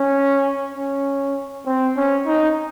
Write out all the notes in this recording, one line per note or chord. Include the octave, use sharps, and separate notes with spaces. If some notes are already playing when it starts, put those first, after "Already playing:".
Already playing: C#4
C#4
C4
C#4
D#4